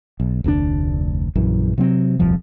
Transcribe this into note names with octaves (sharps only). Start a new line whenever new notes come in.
B1
F1 D2 C#3 D4
A#1 F#2 E3
C3 F#3 C4
D#1 C2 F2 F3